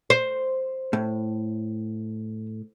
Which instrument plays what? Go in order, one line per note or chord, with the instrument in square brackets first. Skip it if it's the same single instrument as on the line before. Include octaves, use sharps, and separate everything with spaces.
[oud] C5
[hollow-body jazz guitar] A2